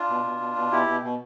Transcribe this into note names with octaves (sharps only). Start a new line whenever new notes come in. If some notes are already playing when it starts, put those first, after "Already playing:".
Already playing: D4 F4
B2
B2
B2
B2
B2 E4 G4
B2
B2